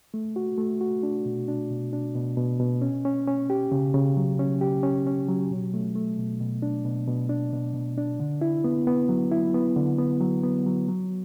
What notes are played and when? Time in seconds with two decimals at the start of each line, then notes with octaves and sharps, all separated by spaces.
0.14 A3
0.36 F#4
0.58 A3
0.81 F#4
1.03 D4
1.26 B2
1.48 D4
1.71 B2
1.93 D4
2.15 B2
2.37 B2
2.60 B2
2.82 C#4
3.05 C#4
3.27 C#4
3.50 G4
3.72 C#3
3.94 C#3
4.17 F#3
4.39 C#4
4.61 G4
4.83 C#4
5.06 C#4
5.29 F#3
5.51 B2
5.74 A3
5.95 A3
6.18 B2
6.40 B2
6.62 D4
6.85 B2
7.08 B2
7.29 D4
7.53 B2
7.74 B2
7.98 D4
8.20 D3
8.41 E4
8.64 B3
8.87 B3
9.09 F#3
9.31 E4
9.55 B3
9.76 D3
9.98 B3
10.21 F#3
10.43 B3
10.66 F#3
10.88 F#3